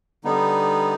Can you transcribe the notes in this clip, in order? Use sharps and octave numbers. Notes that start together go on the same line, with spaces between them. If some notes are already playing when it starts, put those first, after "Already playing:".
D3 G3 B3 D#4